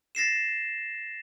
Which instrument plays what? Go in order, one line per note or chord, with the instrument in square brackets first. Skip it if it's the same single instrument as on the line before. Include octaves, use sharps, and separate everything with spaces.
[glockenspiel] A6 A#6 C7 E7